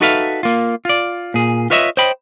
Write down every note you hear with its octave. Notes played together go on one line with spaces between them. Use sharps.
D#4 F#4 A4 B4 E5 F5
A#3 F4
F4 D5
A#2 G#4
F4 B4 C#5 D#5 E5
C5 C#5 D#5 G5 B5